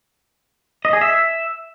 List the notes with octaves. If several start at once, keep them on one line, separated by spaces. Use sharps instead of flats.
D#5
G#4
E5